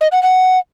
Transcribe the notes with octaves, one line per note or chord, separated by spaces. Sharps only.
D#5
F#5
F#5